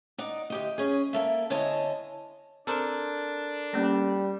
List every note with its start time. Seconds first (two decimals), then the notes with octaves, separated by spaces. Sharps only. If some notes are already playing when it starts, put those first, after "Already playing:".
0.18 D#4 D5 F#5
0.50 D2 G4 D#5
0.78 C#4 G#4
1.13 A#3 A4 E5
1.50 E2 D3 C#5 D#5 G#5 A5
2.67 C4 D4 A4 A#4 C5
3.74 G3 A#3 C#4